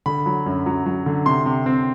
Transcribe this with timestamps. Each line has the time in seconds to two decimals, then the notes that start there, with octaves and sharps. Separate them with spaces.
0.06 D3 B5
0.26 F#3
0.46 F#2
0.66 F#3
0.86 F#3
1.06 D3
1.26 C3 C6
1.46 C3
1.66 C4